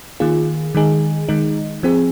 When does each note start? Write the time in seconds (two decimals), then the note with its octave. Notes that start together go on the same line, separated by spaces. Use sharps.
0.20 D#3 A#3 F4 G#4
0.75 D#3 G#3 D#4 G#4
1.29 D#3 G#3 D#4
1.83 F3 C4 G#4